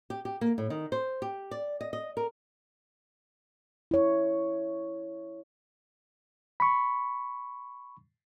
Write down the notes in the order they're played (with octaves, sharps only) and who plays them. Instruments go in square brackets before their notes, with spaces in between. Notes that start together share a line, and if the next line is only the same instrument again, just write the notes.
[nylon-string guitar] G4
G4
A#3
A2
D#3
C5
G4
D5
D#5
D#5
A#4
[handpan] E4 C#5
[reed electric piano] B5 C#6